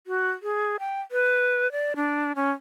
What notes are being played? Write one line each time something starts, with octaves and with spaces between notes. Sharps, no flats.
F#4
G#4
G5
B4
D5
D4
C#4